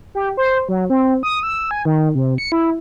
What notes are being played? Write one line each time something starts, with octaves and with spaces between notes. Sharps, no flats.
G4
C5
F#3
C4
D#6
E6
G#5
D#3
C3
C#7
E4